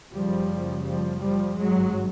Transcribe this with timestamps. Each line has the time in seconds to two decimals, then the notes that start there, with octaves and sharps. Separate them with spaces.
0.11 F#1 F#2 C#3 F3 G3
0.84 F3 G3
1.20 F3 G3
1.55 G#1 G2 F#3 G#3